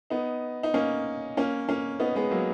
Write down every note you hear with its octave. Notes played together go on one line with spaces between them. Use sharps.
B3 D#4
D#4
A#3 C#4
A#3 C#4
A#3 C#4
B3 D#4
G#3 B3
F#3 A#3